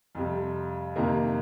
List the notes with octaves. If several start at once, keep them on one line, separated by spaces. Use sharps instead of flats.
F2 C3 G3
F2 C3 D#3 A#3